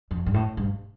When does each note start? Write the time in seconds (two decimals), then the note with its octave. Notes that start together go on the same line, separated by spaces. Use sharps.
0.11 F2
0.26 G2
0.34 A2
0.57 G2